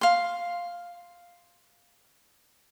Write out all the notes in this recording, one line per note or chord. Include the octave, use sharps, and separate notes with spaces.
F5 C6